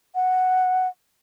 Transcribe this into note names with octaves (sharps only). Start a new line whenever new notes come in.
F#5